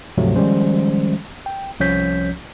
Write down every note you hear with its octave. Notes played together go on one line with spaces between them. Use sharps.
D2 G#2 C3 F3 F#3 A3
D#3 F3 G3 G#3 C#4 C5
G5
C2 F3 C#4 C#5 G6 B6